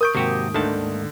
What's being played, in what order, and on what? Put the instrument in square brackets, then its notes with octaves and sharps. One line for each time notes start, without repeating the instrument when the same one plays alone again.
[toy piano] A#4 C#6 [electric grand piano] D#6 G6 D7
[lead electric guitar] D#2 G#2 [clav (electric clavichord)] C3 F#4 G4
[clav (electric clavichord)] D2 D#3 A5 [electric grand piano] D3